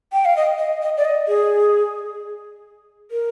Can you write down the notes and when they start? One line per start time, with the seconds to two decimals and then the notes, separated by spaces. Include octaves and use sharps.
0.13 G5
0.25 F5
0.36 D#5
0.58 D#5
0.82 D#5
0.97 D5
1.05 D#5
1.28 G#4
3.11 A#4